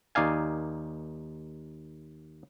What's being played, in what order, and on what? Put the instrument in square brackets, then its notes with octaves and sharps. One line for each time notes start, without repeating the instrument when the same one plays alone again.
[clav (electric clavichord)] D#2 D#4 D5 F5 G#5